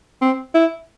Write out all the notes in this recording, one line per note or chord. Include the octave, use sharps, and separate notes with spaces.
C4
E4